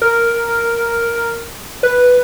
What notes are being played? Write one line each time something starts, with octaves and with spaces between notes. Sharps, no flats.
A#4
B4